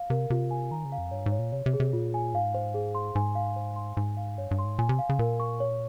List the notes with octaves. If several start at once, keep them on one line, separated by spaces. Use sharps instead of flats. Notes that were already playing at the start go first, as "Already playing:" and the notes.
Already playing: F5
C3 A#4
C3 F4
G#5
D#3 A#5
C#3
F5
F2
G2 C#5
G#2
C#5
A#2
C3 C#5
C3
G#4
C3
A#2 F4
G#5
G#2 F5
C5
G#4
C6
G#2 G#5
F5
C5
C6
G#2 G#5
F5
G2 C#5
G2
C6
G#2
A#2 G#5
C3
F5
C#3
A#2 A#4
C#6
C#5